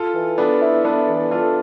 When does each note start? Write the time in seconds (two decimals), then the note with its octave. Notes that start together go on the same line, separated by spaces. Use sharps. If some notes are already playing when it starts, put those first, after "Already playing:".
Already playing: F4 A4
0.15 E3
0.38 B3 D4 A4
0.61 E4
0.84 B3 D4 A4
1.08 E3
1.31 D4 F4 A4